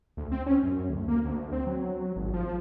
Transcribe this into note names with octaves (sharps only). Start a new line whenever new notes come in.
D2
C4
C#4
F#2
D2
A#3
D2
C4
F#3
G#1
F3